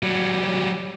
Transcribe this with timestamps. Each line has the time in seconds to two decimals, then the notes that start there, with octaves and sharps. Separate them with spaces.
0.03 F#3 G3